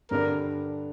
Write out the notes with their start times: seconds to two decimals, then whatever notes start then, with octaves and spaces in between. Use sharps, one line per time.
0.11 G2 D3 G3 D4 A#4